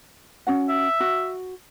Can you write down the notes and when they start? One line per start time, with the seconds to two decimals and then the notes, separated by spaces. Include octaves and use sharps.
0.47 C#4 F#4 F#5
0.69 E5
1.00 F#4